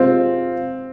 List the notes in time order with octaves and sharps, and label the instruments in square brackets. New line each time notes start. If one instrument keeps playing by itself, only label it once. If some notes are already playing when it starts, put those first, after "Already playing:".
Already playing: [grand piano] C3 G#3 F4 [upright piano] C4